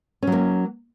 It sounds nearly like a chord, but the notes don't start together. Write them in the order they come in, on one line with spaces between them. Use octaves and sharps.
C#4 F#3 A#3